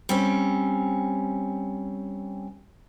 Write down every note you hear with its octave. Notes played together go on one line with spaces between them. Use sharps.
G3 C4 C#4